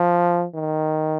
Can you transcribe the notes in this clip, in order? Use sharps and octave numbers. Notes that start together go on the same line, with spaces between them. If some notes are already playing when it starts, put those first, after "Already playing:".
Already playing: F3
D#3